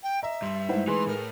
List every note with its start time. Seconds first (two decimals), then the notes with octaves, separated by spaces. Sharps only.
0.03 G5
0.23 D#5 E5 A#5
0.42 G2 C6
0.69 G#3 A3 D#4 E4 C5 F#5
0.87 E3 G#4 B4 C6
1.07 A2 A#4